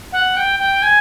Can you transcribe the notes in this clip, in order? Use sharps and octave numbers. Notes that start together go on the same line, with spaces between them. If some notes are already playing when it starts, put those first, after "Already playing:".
F#5
G5
G5
G#5